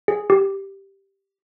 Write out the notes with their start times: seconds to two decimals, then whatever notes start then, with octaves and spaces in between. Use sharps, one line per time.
0.08 G#4
0.30 G4